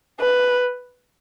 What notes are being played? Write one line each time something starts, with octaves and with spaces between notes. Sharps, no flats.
B4